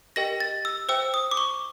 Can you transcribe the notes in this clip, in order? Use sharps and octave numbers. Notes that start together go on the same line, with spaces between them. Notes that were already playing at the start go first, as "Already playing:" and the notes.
G4 A#4 D#5 G5 A#6
A6
E6
C5 E5 G5 E6
D#6
D6
C#6